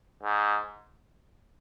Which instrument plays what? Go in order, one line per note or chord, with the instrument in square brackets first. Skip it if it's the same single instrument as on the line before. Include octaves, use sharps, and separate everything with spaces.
[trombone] G#2